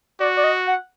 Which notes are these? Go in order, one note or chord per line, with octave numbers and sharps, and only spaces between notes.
F#4 D5
D5
D#5
F#5